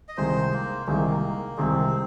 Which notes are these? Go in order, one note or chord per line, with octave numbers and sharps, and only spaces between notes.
D#5
C2 C3 D#3 G#3 C5
A#3
C2 C3 D#3 G#3 A#3
C2 C3 D#3 G#3 C4